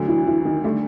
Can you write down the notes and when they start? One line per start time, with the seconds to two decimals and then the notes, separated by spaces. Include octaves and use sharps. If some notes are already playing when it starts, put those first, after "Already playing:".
Already playing: D2 D3 F#3
0.08 E3
0.27 E3
0.45 D#3
0.64 D3 G3 A3